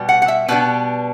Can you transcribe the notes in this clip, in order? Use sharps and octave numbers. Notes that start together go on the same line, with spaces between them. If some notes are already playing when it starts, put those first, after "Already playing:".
Already playing: B2 G3 B3
F#5
F#5
E5
B2 G3 B3 D4 B4